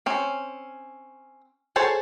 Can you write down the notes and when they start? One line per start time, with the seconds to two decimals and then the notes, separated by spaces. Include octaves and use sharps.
0.06 C4 C#4
1.76 G#4 A4 C5 C#5 A5